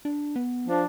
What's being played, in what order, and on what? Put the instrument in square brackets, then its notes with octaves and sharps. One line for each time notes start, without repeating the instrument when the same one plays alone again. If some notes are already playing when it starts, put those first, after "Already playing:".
[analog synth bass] D4
B3
[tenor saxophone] F3 [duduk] D4